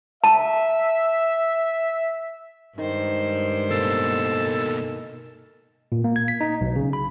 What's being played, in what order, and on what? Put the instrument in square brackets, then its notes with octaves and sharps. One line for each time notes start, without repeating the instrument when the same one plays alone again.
[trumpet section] E5 [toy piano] A5
[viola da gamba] G2 G#3 C5 [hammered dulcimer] D#3
[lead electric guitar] B2 A#3 [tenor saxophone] A4
[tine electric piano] A#2
A#3
G#6
B6
D#4
B1
C#3
B5